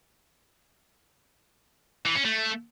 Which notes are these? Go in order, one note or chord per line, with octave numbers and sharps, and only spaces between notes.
E3
C#4
A3